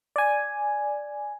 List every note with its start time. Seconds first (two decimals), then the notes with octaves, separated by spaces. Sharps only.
0.16 D5 G#5